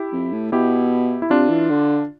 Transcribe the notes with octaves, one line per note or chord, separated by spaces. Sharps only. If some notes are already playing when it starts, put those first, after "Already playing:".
Already playing: E4 G4
F2
A2
B2 E4 G4
E4
C3 D4 F4
E3
D3